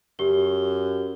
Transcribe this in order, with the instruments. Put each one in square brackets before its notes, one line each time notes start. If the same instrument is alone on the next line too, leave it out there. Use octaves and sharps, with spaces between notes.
[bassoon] F#2 [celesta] G4 G7